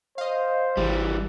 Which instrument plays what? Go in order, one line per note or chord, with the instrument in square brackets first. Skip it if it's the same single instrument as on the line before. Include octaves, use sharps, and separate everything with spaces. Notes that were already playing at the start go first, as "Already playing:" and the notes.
[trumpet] C5 [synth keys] D#5 F5
[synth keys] G#1 [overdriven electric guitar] E3 G3